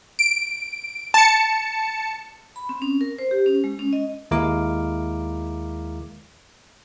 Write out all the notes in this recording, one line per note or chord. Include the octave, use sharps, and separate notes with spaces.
D7
A5 C#7
B5
C4
C#4
A#4
C5
G4
C#4
G#3
C#4
D#5
D#2 G#3 E4 A#4 F5 D6